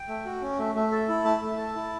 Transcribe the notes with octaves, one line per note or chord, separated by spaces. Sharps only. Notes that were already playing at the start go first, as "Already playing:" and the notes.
Already playing: G5
A3
F#4
C#4
A3
A3
A4
E4
A3 A5
A3
A4
E4